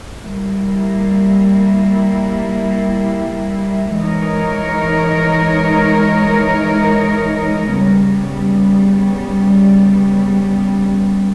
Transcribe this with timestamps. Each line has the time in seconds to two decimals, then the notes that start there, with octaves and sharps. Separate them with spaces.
0.23 G3 A#3 E4
3.99 E3 G#3 D#4 A#4 C#5
7.76 C#3 G3 B3